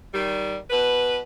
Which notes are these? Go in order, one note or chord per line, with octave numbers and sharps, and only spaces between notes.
D#3 G3
B2 B4